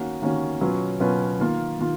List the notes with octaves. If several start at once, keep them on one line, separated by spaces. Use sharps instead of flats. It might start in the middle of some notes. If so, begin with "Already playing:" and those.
Already playing: D#3 A#3 C#4 F#4
D#3 A#3 C#4 F#4
B2 F#3 C#4 F4 B4
B2 F#3 C#4 F4 B4
D#3 A#3 F4
D#3 A#3 F4